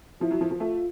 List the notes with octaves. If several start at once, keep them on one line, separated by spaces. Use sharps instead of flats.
F3 E4
F#3
F3
F3
A3 F4